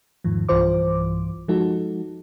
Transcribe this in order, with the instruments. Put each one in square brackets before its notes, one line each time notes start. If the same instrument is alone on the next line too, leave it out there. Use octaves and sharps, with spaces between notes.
[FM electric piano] E2 G#2 D#3 F3
B1 G2 E3 F4 C5 D6
F3 G#3 D#4 F#4 A4